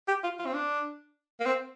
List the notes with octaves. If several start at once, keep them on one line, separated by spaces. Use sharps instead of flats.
G4
F4
F4
C4
D4
A#3
C4